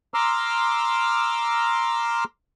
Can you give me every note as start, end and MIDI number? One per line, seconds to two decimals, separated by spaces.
0.14 2.24 82
0.14 2.24 84
0.14 2.24 86
0.14 2.24 88
0.14 2.24 89